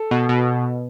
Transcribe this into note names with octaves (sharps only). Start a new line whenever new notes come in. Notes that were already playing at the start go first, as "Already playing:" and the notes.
Already playing: A4
B2
B2